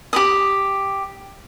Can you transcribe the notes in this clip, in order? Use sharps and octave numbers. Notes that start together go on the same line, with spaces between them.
G4 B5 D#6